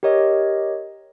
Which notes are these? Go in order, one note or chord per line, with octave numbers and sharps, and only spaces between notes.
G4 A#4 C#5 D#5